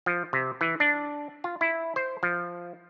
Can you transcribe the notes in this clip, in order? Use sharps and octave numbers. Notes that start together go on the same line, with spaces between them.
F3
C3
E3
D4
F4
E4
C5
F3